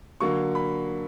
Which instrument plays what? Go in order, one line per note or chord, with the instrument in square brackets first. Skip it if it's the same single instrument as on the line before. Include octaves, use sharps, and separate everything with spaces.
[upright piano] D3 F#3 A#3 C#6
B5